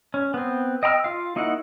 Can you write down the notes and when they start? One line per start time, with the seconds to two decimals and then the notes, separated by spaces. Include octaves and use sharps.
0.14 C#4
0.34 B3 C4
0.83 D#5 G5 A#5 E6 F6
1.04 F4 F5
1.36 A#3 D#4 E4 F#4 F#5